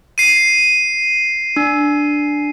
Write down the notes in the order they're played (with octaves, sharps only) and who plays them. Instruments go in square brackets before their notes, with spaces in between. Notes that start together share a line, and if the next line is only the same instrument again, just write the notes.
[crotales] C7 D#7
[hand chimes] D4